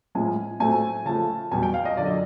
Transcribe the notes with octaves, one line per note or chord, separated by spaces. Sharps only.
A2 F3 G#3 G#5
A2 F#3 A3 C4 G#5
C#3 F3 A3 A5
E2 B2 G3 G#5
G5
F5
D#5
F#2 D3 F#3 D5
D#5